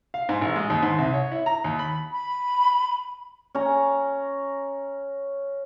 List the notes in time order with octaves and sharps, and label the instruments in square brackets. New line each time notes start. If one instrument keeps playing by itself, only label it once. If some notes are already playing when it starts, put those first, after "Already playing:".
[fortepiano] F5
G#2
A1
G#3
D#2
G#2
C2
C#5
E4
A#5
D#2
B5
[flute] B5
[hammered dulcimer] C#4 A#5